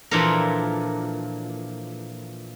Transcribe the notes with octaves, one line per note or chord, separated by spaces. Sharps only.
A#2 E3 F3 D4 A4 A#4